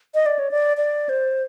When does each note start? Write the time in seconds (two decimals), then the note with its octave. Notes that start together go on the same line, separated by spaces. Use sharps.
0.15 D#5
0.26 D5
0.39 C#5
0.51 D5
0.77 D5
1.09 C5